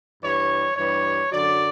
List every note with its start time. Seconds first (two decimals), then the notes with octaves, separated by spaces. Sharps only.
0.22 G2 E3 G3 C#5
0.77 G2 E3 G3 C#5
1.32 F#2 D3 F#3 D5